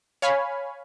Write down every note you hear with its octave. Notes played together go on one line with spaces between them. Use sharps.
C#5 F5 G#5 B5